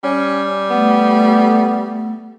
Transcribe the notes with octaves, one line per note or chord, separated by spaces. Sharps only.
G3 C#4
A3 B3